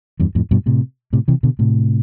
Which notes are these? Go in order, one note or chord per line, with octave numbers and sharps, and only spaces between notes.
E2 G2
F2 A2
G2 B2
A2 C3
A2 C3
C3 E3
B2 D3
A2 C3